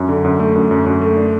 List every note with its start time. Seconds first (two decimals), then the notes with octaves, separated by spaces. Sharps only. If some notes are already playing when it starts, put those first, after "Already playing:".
Already playing: F#2
0.09 D3
0.24 F#2
0.40 A3
0.55 F#2
0.71 F#2
0.86 F#2
1.01 A3
1.17 D4